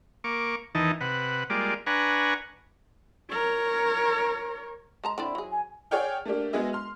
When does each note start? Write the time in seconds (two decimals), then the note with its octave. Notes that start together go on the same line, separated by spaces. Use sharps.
0.24 A#3 C#6 D6
0.75 E2 D#3 E3 D#4 A5
1.01 C3 B4 F#5
1.50 G3 G#3 A#3 F4 D5
1.86 D4 B4 F#5 G#5 A#5 C#6
3.30 A#4 C#5
5.04 G#3 A5 A#5
5.18 D3 C4 E4 D5
5.35 F#3 G#4
5.51 G#5
5.91 G#4 C#5 D5 F#5 G5 F6
6.25 A3 A#3 D4 G4
6.53 G#3 B3 F#4 G#4 D#5 E5
6.73 C6 F6